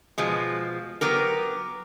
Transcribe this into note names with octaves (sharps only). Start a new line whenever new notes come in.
B2 F3 G#3
F#3 B3 G4 A#4